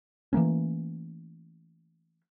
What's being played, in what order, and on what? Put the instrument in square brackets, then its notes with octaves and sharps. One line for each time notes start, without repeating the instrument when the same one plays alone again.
[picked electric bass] E3 A3 A#3 C#4